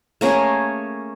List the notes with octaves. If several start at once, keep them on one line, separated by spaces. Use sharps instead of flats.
A3 A#3 C#4 G#4